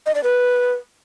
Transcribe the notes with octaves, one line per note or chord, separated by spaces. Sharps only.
D#5
D5
B4